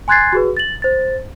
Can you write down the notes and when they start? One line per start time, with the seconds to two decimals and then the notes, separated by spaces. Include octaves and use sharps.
0.08 G#5 C6 F#6 G#6 A6 C7
0.33 F#4 G#4 B4
0.57 A6 F#7
0.82 C5 A6